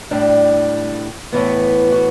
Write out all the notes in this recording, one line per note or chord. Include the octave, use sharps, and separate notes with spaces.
A2 G3 D4
A2 E3 B3
F#4